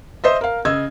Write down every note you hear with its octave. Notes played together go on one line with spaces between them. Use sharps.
C5 D#5 E5
A#4 F5
C#3 D#5 E6 G#6